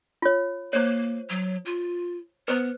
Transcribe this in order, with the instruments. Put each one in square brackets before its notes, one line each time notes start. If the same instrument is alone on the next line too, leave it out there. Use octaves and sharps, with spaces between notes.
[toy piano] F4 C#5
[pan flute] A#3 [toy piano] C5 C#5
[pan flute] F#3
F4
[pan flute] B3 [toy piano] B4 C5